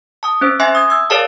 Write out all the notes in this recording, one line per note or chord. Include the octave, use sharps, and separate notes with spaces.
A5 D#6
C4 C#4 C5
C4 E5 G#5 C6 A#6
D#6 G#6
E6 G#6
G#4 A#4 C#5 D5 F5 A5